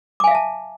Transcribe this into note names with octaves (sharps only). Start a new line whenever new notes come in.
E5 F5 G#5 A5 D6